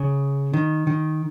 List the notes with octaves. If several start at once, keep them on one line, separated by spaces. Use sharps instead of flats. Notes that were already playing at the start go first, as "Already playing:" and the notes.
Already playing: C#3
D#3
D#3